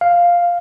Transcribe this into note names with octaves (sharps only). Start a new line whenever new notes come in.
F5